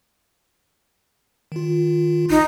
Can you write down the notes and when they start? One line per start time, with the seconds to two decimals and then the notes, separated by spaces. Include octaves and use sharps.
1.52 D#3 F4
2.30 A#1 D#4